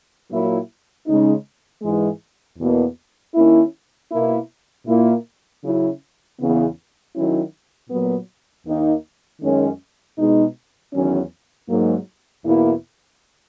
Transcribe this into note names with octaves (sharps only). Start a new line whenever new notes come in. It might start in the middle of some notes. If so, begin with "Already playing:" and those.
A#2 F#3 A#3 E4
C#3 G#3 D#4
G#2 E3 G#3
E2 B2 A#3
D#3 A#3 C#4 E4
B2 A#3 E4
A#2 A#3 E4
C#3 F#3 C#4 E4
E2 C#3 E3 B3
D#3 F#3 C#4 E4
A#2 F#3 B3
D#2 D#3 A#3 D#4
F#2 D#3 G#3 C#4
B2 G#3 D#4
E2 D#3 F#3 C#4
G#2 F#3 A#3
E2 B2 A#3 E4